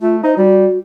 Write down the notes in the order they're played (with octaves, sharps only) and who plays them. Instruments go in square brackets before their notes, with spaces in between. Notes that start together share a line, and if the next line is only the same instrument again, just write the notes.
[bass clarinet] A3 [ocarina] F4
[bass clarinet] D#4 [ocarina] C5
[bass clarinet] G3 [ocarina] F#4